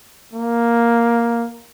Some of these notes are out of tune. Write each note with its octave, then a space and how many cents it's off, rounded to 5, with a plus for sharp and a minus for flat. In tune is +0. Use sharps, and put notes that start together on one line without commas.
A#3 +5